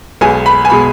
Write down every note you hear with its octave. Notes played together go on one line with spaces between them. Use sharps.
B1 B2 G#3 G#5
B5
G#5
B2 G#3 B5